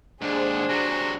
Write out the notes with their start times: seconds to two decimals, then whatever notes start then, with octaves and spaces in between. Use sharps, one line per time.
0.22 D#2 G#2 D4 G#4 C5
0.69 C3 F#3 F#4